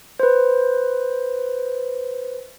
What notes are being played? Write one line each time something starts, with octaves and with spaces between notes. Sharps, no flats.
B4 C5